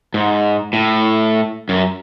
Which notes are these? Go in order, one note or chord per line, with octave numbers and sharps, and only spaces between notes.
G#2
A2
F#2